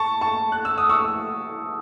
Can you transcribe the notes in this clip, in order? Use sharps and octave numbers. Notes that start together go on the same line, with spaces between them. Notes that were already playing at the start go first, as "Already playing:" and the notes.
Already playing: A5 C#6
A5 C#6
F#6
E6
D#6
C#6 E6